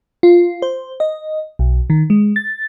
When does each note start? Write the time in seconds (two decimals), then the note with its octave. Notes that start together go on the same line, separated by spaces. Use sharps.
0.23 F4
0.62 C5
1.00 D#5
1.59 B1
1.90 D#3
2.10 G#3
2.36 A6